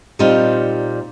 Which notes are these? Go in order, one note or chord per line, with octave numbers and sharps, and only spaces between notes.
A#2 G3 C4 D#4 F4